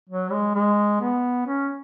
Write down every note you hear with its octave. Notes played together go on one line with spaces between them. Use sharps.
F#3
G#3
G#3
B3
C#4